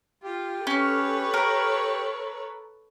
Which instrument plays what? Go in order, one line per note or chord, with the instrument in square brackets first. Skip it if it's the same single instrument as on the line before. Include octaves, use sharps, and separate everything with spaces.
[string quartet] F4 [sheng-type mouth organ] G4
[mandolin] C#4 [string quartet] A4 B4 C#5
[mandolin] A#4